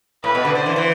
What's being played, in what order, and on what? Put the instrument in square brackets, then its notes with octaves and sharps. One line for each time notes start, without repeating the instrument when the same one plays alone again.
[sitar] A2 [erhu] B4
[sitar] B2
D3
[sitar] D3 [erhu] C5
[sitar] E3
E3